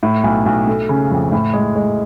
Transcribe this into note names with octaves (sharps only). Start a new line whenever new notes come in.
A2
B1
B1
A3
C#3
F2
A2
G#3
G#3